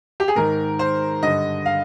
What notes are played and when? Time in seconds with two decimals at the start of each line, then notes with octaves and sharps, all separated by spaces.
0.20 G4
0.28 G#4
0.36 G#2 D#3 A#4
0.79 C5
1.22 G2 D3 D#5
1.66 F5